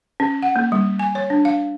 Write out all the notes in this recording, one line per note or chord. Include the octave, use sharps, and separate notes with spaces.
C#4
F#5
A#3
G3
G#5
C#5
D4
F5